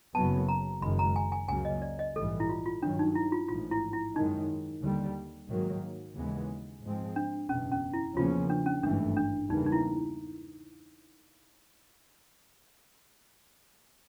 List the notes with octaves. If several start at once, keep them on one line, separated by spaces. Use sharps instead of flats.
F#1 F#2 C#3 F#3 B3 A5
A#5
F#1 F#2 D#3 G#3 B5
A#5
G#5
G#5
C#2 C#3 F#3 A#3 G#5
D#5
D5
D#5
A#1 G#2 E3 G3 A4
E4
F4
F4
G2 D#3 F#3 D4
D#4
E4
F4
A1 G#2 F3 F4
E4
E4
F#2 D#3 G#3 D#4
D#2 D3 G3
G#2 D#3 F#3 A#3
D#2 C#3 E3 G#3 B3
G#2 F3 G#3 C4
D4
F#1 E2 B2 C#4
C#4
E4
E2 C#3 F3 A#3 C#4 F4
D4
C#4
G#1 G2 E3 A3 D4
D4
E2 C#3 E3 G3 A#3 D#4
D#4
E4